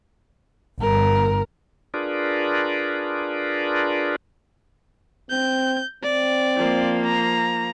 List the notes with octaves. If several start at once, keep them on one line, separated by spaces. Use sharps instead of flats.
G1 A#4
D4 F4 G#4 A#4 B4 D5
C4 G6
C4 D5
F3 A#3
A#5